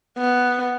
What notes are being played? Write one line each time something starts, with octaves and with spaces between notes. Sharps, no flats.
B3